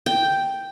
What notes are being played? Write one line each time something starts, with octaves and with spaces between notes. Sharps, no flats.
G5